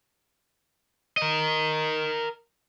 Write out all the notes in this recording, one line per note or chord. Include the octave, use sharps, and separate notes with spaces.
A#4 D#5